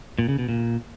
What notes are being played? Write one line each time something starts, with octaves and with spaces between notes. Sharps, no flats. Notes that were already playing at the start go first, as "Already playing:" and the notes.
A#2
C#3
B2
A#2